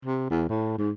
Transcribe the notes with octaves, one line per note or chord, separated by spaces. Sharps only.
C3
E2
A2
G#2